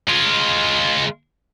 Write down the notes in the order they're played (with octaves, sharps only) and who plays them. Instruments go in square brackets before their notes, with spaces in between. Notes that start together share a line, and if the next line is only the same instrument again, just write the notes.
[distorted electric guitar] G#3 F4